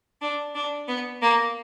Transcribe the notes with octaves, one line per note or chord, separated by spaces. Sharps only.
D4
D4
B3
A#3